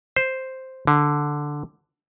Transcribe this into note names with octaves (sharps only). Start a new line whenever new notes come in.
C5
D3